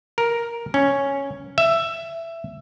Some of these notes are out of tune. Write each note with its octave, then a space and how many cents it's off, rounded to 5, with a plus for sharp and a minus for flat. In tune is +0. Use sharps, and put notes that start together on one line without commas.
A#4 +5
C#4 +0
E5 +15